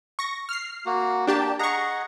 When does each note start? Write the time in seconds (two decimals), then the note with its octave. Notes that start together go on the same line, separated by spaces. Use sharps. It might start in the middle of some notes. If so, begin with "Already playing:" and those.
0.19 C#6 A#6
0.49 F6 C7
0.86 A#3 F#4
1.27 A#3 D4 G4 G5 A5
1.59 G#4 D#5 F#5 A#5 C#6